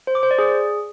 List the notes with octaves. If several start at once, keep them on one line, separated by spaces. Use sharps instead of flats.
C5
D6
C5
D5
G#4